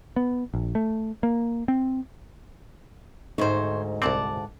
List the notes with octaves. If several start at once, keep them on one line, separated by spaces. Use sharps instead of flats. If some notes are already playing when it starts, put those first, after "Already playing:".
B3
A#1
A3
A#3
C4
D2 G#2 D#4 C5 C#5
C2 C4 D5 F#5 A5